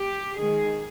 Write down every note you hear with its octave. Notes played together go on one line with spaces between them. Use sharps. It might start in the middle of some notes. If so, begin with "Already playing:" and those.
Already playing: G4
D#3 G#3 G#4